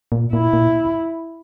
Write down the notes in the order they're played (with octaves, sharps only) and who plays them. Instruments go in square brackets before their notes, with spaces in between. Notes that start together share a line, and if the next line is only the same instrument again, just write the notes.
[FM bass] A#2
[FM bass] A#2 [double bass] E4
[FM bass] A#2